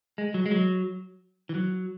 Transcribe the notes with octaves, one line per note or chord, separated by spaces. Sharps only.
G#3
F#3
G#3
F#3
E3
F#3